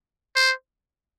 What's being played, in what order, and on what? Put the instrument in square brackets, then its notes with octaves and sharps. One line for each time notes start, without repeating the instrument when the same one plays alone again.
[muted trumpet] C5